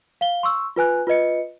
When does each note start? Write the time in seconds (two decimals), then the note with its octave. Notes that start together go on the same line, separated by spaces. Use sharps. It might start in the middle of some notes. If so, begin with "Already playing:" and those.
0.21 F5 G7
0.43 C6 C#6 E6
0.76 F4 B4 G#5 F#6
1.07 F4 B4 D#5 C#7